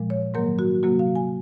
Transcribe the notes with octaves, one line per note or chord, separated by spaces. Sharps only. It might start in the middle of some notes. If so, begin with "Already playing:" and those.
Already playing: A#2 F3 G#3
C#5
G#2 D#3 F#3 A#3 A#4
F#4
C3 F#3 A#3 F#4
F5
G#5